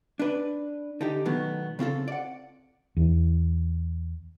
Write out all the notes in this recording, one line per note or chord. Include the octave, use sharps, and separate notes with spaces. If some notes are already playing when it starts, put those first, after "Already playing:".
D4 B4
D3 D#4 G4
B2 D#3 F#3 A3 B3
C#3 C4 F4 A4
D5 F#5
E2